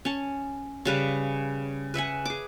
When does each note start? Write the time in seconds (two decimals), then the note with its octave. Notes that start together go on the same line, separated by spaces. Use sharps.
0.05 C#4 A5
0.85 C#3 G3 B4 F5
1.94 B4 E5 F#5 G#5
2.26 G#4 D6